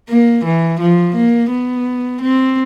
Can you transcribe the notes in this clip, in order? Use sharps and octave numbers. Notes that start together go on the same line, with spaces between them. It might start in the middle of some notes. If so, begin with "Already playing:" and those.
A#3
E3
F3
A#3
B3
C4